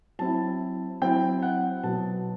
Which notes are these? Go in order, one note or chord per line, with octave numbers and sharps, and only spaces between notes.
F#3 C4 E4 A5
F#3 C4 E4 G5
F#5
B2 F#3 B3 A5